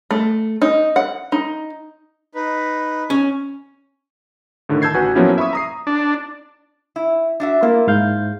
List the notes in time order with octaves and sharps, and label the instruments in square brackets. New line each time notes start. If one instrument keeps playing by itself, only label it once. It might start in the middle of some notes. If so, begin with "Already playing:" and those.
[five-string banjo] A3
D#4
F#5
D#4
[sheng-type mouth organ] D#4 B4
[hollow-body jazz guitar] C#4
[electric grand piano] A2 D3 D#3
A5 E6 G6 G#6 C7
A1 F#4 B4 G#5
F3 F#3 A#3 B3 C#4 E4
E5 B5 C#6 D#6
A#5 D#6 C7
[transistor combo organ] D4
[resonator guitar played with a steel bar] E4
D4 F#4 E5
[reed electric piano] A#3 [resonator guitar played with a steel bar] E4 F4
[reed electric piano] G#2 F5 G6